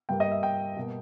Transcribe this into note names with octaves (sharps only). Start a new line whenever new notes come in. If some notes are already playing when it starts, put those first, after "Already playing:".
G2 G3 A#3 G5
D#5
E5
G5
B2 G3 A#3